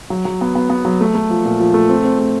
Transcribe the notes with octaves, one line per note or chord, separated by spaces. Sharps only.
F#3
F#3
B3
B3
B3
F#3
A3
A3
F3
A#2
F3
A3
C4
C4
A3